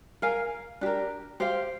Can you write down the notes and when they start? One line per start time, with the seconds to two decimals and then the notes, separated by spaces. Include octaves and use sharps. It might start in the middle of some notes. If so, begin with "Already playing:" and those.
0.22 A#4 F5 G#5
0.81 D4 G4 A#4
1.40 G4 C5 F5